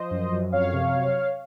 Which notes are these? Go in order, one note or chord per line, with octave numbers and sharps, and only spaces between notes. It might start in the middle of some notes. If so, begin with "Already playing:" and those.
Already playing: F3 C5 D#5
F#2
F#2
F2 C#5 F5
C3
F#3